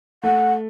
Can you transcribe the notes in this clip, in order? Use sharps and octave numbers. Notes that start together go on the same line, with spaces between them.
A3 F#5